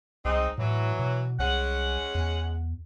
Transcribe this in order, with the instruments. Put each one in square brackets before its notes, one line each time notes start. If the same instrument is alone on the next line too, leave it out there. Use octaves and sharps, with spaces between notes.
[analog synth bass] C2 [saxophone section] G#3 C4 D#4
[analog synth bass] A2 [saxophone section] E3 F#3
[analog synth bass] B2
[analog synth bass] C2 [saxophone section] G#3 C#4 F#5
[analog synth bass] E2